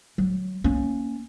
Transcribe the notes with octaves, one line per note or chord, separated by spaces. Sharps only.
F#3
A#3 C#4